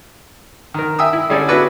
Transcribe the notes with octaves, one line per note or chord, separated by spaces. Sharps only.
D#3 A#4
E5 G5 G#5 D#6 E6
E4
D3 G3 C#4 G#4 A4 D5
B3 D4 E4 F#4 B4 D5